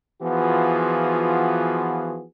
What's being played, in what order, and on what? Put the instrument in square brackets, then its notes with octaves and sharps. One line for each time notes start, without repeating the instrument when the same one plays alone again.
[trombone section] E3 F3 B3 F4 F#4 G#4